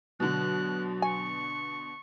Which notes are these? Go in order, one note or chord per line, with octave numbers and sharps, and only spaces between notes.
B2 D3 F#3 F#6
G#5 C#6